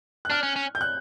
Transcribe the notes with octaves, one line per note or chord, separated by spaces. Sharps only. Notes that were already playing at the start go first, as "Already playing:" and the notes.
F#6
D4 F6
C#4
C#4
G6
F#6